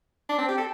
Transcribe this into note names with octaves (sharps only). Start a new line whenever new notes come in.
D4
C4
G4
A4